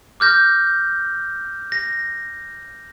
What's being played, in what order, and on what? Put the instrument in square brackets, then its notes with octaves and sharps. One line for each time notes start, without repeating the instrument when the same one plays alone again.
[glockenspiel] D6 F6 G6 A#6
A#6